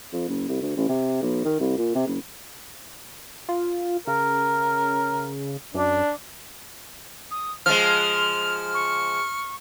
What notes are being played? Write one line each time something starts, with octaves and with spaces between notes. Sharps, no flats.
F2
F#1
C2
D2
A1
C3
B1
D#3
C2
A#2
C3
F#1
F4
C#3 A#4
F#2 D4
D#6
F3 G#3 F6 F7
C#6